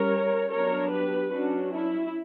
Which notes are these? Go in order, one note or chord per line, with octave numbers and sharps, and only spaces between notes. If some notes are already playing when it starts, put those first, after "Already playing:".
Already playing: G3 C#4 A#4 C#5
F#3 B3 D4 A#4 C#5
G4 B4
F#3 C#4 D4 F#4
E4